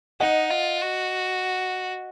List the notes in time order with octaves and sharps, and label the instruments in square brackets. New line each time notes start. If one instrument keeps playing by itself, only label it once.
[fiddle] D#4 [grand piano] D#5 F#5
[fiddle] F4
F#4